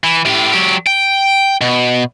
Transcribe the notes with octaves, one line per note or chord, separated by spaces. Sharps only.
E3
A2 G4
F#3 G4
G5
B2